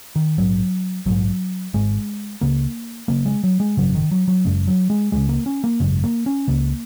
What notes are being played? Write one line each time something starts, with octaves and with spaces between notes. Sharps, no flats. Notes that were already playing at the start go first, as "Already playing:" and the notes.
D#3
A#1 G#2 F#3
A#1 G#2 F#3
G#1 G#2 G#3
C#2 C#3 A#3
F#1 F#2 C#3 A#3
G#3
F#3
G#3
G#1 F#2 C#3 F#3
D#3
F#3
F#3
F#1 F#2 C#3 G#3
F#3
G#3
C#2 C#3 G#3
A#3
C#4
A#3
G#1 F#2 C#3 G#3
A#3
C#4
C#2 C#3 A#3